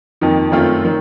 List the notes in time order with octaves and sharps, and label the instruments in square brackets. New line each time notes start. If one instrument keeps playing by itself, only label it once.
[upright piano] F2 D#3 A#3 D#4
F#2 D#3 A3 C4 F4
D#3